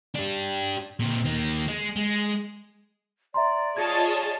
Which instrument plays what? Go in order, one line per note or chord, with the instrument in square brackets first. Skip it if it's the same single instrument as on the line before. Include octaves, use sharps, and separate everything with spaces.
[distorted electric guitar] D4 G4
A#2 C4
D#3 A#3
G#3
G#3
[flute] D5 [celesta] E5 A#5 C6
[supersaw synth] F4 C#5 D#5 [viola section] G#4 A5 [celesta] G#6